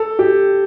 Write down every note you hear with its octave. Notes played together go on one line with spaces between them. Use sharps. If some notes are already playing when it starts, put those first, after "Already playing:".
Already playing: A4
G4